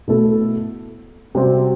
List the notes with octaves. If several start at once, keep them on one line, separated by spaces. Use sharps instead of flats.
B2 A3 E4 A4
C3 G3 C4 F#4